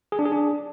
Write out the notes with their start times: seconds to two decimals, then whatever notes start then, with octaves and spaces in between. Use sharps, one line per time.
0.12 G#4
0.19 D4
0.25 G#4
0.32 D4